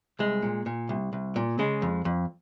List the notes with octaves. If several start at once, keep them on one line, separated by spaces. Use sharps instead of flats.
C2 G#3
A#2
A#2
C2
C2
A#2
C#3 G#3
F2
F2